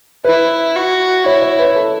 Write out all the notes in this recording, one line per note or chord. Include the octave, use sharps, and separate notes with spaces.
E4 B4
F#4
E4 C#5
C#5
B4
A4